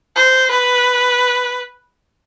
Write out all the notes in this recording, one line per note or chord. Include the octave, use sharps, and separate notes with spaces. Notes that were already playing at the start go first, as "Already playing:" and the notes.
C5
B4